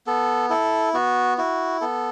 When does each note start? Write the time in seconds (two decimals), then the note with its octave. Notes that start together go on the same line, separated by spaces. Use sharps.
0.07 B3 A4
0.50 E4 A4
0.93 B3 F#4
1.38 E4 F#4
1.81 B3 A4